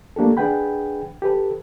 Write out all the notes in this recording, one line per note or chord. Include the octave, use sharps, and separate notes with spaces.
A3 A#3 D4 G4 A4
D4 G#4 B4 F#5 G5 B5
G4 A4 B4